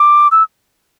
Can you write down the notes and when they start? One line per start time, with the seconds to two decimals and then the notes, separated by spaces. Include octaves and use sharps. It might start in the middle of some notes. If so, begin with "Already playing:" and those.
Already playing: D6
0.31 E6